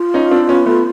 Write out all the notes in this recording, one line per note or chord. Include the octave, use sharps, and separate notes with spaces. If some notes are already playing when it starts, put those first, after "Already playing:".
Already playing: F4
C#4 D#4
C4 D4
B3 C#4
A3 B3